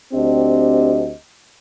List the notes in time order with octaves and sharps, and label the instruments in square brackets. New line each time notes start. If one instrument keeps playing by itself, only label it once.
[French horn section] D2 C4 D4 G4 D#5